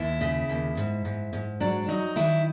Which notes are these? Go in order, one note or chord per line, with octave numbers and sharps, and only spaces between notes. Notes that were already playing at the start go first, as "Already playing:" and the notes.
Already playing: D#2 E4
C#3
D#2
G#2
G#2
G#2
F#3 D4
F#3 D#4
D#3 E4